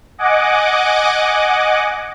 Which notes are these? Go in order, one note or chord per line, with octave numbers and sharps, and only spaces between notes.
D#5 F#5 G#5 D6